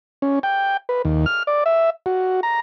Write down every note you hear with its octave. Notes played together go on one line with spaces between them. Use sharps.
C#4
G5
B4
D#2
F6
D5
E5
F#4
A#5